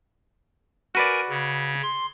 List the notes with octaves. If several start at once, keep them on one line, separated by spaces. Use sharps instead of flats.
F#4 A#4 B4 D5 G#5
C#3
C6